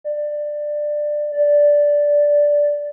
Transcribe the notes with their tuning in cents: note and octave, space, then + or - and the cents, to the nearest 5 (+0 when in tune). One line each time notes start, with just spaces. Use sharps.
D5 +15
D5 -5